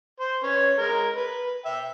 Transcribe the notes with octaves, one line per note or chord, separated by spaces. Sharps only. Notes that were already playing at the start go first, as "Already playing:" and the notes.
C5
C#4 B4 C#5
G#3 A#4
B4
E5 G5